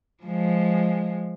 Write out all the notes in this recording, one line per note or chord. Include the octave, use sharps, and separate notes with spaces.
F3 G#3